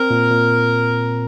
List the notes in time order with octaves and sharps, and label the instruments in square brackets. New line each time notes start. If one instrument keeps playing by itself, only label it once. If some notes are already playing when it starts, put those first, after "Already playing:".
Already playing: [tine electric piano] C4 [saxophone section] A#4
[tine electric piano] A#2
A#2